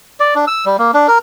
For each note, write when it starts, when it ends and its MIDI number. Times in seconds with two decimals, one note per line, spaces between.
0.20 0.34 74
0.35 0.45 62
0.47 0.65 88
0.66 0.77 55
0.78 0.91 58
0.94 1.07 62
1.08 1.18 70